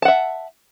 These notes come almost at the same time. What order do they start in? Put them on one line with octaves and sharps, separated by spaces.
A5 F#5 E5